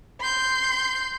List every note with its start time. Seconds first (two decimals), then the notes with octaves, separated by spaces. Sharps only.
0.20 C6 G6